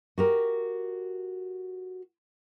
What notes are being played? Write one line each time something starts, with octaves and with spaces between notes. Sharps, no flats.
F#4 G4 A#4